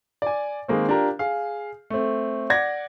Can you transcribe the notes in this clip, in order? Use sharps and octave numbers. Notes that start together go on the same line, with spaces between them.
D5 G#5
D#3 G#3 A#3 C4
D4 F4 G4 A#4 A#5
G#4 F5
A3 C4
D5 F#5 G#6 A#6